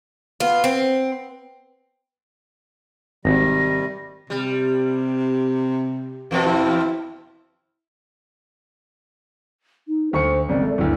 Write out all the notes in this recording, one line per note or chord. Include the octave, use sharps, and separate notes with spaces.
B3 F4
C4
G#1 C3 D#3 G3 A#6
C3 G3
E2 B2 F3
E4
D#4
D2 C5 C#6 C#7
G#1 C#3 D5
A3
G1 D2 E4